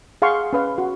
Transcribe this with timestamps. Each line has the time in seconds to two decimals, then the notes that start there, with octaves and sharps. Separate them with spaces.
0.22 G#4 F5 F#5 C6 C#6
0.53 C#4 B4 F5
0.78 F#4